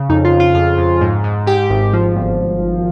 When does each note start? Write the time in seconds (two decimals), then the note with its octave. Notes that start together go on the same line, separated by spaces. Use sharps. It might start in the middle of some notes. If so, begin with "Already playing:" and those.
Already playing: C#3
0.09 F2 D#4
0.25 F4
0.32 F2
0.40 F4
0.55 F2 F4
0.78 F2
1.01 G#2
1.24 G#2
1.46 G#2 G4
1.70 G#1
1.93 F3
2.16 G1